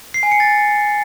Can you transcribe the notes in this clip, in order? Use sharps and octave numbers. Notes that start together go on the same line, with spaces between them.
C7
G#5
C#7
A6